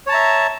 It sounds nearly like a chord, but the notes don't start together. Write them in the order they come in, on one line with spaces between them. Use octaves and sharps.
C#5 A5 A#5 E5